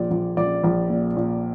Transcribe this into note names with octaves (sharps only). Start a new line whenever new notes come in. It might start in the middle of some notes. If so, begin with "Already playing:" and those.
Already playing: A#1 A#2 D5
A#1
A#1 D5
A#1
A#2
A#2